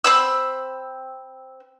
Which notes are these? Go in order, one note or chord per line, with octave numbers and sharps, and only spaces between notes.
C4 B5 E6